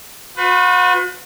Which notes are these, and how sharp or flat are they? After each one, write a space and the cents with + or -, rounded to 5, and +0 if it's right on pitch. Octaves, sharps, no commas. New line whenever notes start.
F#4 -40 B4 +30